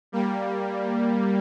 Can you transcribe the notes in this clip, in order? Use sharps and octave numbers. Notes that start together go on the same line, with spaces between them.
G3 A#3